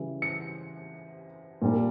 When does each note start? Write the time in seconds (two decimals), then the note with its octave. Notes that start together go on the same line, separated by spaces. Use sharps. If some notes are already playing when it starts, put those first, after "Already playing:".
Already playing: C#3 E3 G3
0.22 C#7
1.62 A#2 G3 A#3 D4